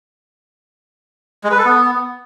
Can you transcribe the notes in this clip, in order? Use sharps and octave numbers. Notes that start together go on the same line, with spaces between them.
G#3
B4
A4
B3